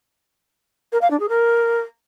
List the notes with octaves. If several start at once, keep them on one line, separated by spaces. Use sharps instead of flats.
A#4
F5
D4
G#4
A#4